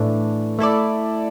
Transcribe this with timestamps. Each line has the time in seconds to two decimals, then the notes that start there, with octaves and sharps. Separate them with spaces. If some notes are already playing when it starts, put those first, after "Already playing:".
Already playing: A2 E3 A3 D4
0.59 A3 E4 A4 D5